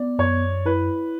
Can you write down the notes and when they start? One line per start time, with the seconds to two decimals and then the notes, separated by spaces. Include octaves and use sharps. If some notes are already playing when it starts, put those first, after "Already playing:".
Already playing: B3 D5
0.19 F#2 C#5
0.66 E4 B4